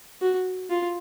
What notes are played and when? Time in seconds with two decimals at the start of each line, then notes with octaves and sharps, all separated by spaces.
0.22 F#4
0.70 F4